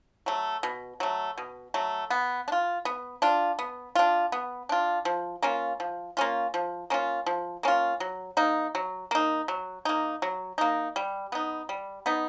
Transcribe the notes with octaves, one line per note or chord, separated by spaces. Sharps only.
F#3 A3
B2
F#3 A3
B2
F#3 A3
B3
D4
F4
B3
D4 F4
B3
D4 F4
B3
D4 F4
F3
A#3 C#4 F4
F3
A#3 C#4 F4
F3
A#3 C#4 F4
F3
A#3 C#4 F4
F#3
A#3 D#4
F#3
A#3 D#4
F#3
A#3 D#4
F#3
A#3 D#4
G3
B3 D#4
G3
B3 D#4